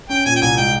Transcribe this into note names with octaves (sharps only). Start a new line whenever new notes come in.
C#4 G5
A#2 G#5
G5
C2 G#5
G#3 G5